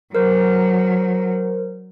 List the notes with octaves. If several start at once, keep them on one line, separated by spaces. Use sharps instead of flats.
F#3 A#4 C5